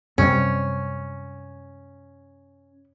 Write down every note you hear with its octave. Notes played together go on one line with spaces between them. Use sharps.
F#2 C3 G3 C#4